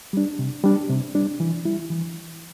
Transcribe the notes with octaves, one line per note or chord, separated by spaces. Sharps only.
G3 D4
C3
G3 D4
C3
G3 D4
E3
G3 E4
E3